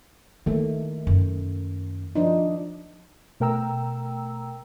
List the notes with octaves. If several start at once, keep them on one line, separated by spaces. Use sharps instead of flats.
D#3 A3 A#3
F#2
F3 D4 D#4
B2 A3 A#4 G5 A#5 E6